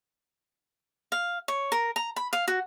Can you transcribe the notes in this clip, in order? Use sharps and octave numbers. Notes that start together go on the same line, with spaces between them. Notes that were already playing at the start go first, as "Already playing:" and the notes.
F5
C#5
A#4
A#5
B5
F5
F#4